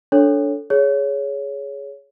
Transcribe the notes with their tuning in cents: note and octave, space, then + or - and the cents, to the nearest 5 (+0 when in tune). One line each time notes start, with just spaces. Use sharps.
D4 -15 A4 +0 C#5 +0
G#4 +5 C#5 +15